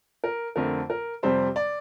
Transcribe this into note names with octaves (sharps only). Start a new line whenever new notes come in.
A#4
F2 D3 A3 C4 A#4
A#4
F2 C3 G3 C4 C5
D5